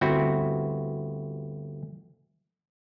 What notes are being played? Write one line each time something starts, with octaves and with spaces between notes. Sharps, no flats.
G1 D2 C4 E4 F#4